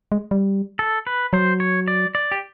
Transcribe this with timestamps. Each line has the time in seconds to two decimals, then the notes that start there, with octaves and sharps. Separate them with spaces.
0.12 G#3
0.31 G3
0.79 A4
1.07 B4
1.33 F#3 C5
1.60 C#5
1.88 D5
2.15 D5
2.32 G4